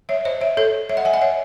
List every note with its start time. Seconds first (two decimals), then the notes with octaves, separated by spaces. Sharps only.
0.09 C#5 E5
0.25 C5 D#5
0.41 C#5 E5
0.57 A4 C#5
0.89 C#5 E5
0.97 D#5 F#5
1.05 E5 G#5
1.13 D#5 F#5
1.21 C#5 E5